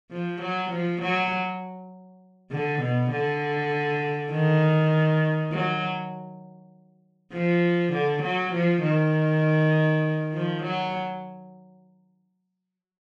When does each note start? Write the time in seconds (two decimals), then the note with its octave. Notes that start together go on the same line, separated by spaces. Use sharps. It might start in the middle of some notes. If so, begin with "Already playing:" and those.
0.11 F3
0.42 F#3
0.72 F3
1.02 F#3
2.52 D3
2.82 B2
3.12 D3
4.32 D#3
5.52 F#3
7.33 F3
7.93 D3
8.23 F#3
8.53 F3
8.83 D#3
10.34 F3
10.63 F#3